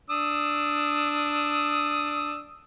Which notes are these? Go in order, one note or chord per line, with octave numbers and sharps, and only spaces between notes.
D4 D#6 E6